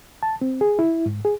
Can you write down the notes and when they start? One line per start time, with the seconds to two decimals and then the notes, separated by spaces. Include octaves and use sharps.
0.23 A5
0.41 C4
0.61 G#4
0.79 E4
1.06 G#2
1.25 G#4